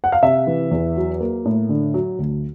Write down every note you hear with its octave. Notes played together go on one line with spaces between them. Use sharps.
F#5
F5
C3 E5
E3
E2
F#3
A#3
A2
D3
F#3
D2